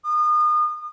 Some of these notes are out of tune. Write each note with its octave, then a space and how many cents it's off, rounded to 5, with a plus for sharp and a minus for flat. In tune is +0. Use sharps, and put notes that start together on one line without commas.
D#6 -35